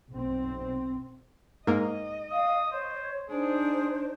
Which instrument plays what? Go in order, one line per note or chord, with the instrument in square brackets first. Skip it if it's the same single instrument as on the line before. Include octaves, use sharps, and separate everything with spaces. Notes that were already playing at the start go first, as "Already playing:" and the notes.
[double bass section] B1 C4
[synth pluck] G#2 A#3 [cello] D#5
[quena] F5 [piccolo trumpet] D#6
[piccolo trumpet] C5 [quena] C#5
[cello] D4 D#4 [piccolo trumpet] G#4 [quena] C5